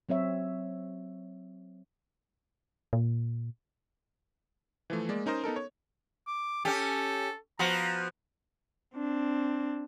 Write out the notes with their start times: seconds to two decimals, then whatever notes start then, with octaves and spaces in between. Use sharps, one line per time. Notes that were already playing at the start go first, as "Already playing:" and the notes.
0.09 F#3 C4 C#5 E5
2.93 A#2
4.90 E3 F3 A3
5.09 G#3 A#3 D5
5.26 C#4 D#4 A#4 C5 D#5
5.44 B3 D#4 A4 A#4
5.56 C#5
6.27 D6
6.65 C#4 G4 A4
7.59 F3 B3 F#4 A#5
8.95 C4 D4